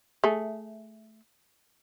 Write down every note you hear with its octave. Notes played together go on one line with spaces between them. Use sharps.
A3 G#4